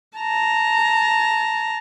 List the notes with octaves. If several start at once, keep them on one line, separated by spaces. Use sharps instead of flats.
A5 A#5